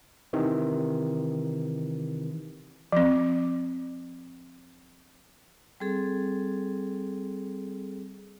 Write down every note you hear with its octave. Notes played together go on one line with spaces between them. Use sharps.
C3 D#3 E3
F3 C4
G3 C4 G#4 A4